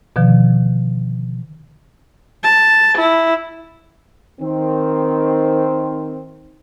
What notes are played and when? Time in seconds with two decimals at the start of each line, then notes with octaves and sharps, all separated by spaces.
0.16 B2 D3 D#3 F3
2.43 A5
2.98 E4
4.41 D#3 C4